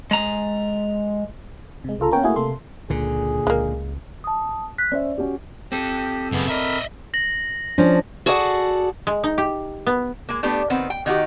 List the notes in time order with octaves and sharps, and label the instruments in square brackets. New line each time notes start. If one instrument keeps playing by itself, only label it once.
[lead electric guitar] G#3 A#5
[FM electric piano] C3 G#3
C2 C#3 F4 A4 A#5
A#3 B3 C#4 A#4 C#5 G5
A3 A#3 E4 F#4 G#4
C3 A3 A#3 A4 C6
[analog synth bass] C#2 [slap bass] A#2 D3 [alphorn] G#4
[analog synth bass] C#2 [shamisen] G#3 A#3
[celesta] A5 D#6
F#6 B6
[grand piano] C#4 C5 E5 [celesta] D5
[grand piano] C#4 F#4 G4
[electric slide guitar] C4 A4 [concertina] G4
[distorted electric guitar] F#2 C#3 [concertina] B3
[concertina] A#4 B5 [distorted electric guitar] D#5 E5
[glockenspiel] A#6 F#7
[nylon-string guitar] F3 C#4 [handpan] D4
[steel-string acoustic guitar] F#4 G#4 A4 D5 F5 F#5
[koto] G#3
D#4
G4
B3
[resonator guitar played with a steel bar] G#3 A#3
A3 B3 D4 G4
D#3 B3 C4
G5
D#3 D#4 F#4 G4